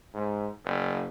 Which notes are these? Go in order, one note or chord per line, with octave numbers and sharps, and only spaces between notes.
G#2
F#1